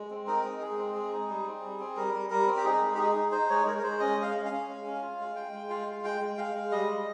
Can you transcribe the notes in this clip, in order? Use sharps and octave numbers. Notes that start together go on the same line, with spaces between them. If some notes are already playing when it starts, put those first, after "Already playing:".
Already playing: G#3
C4
D#4 A#4
G#3
G#3 G#4
C4
G#3
D#4
G3
C4
G3
C4
G3 A#4
G3
G3 A#4
C4
G4
D#4 G#4
G#3
G4
D#4 G#4
D#4
D#4 C5
G#3 C#5
G#3 A#4
A#4
G#3 C5
C#4 D#5
G#3 F5
C#4
F5
C#4
G#3
C#4
F4
G#3
G#3 G5
G#3
F4 F5
G#3
G#3 G5
G#3
G#3 F5
G#3
G3 D#5
G3